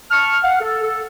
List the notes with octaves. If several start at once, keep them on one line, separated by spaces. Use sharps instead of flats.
A5 C#6 F6
F5 F#5
A4
A4